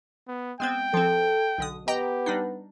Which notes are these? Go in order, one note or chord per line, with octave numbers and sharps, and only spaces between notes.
B3
G#3 B3 C4 G5
F3 C4 A4
B1 D3 D#6
B3 G4 D#5 G5 A#5
G3 D4 D#4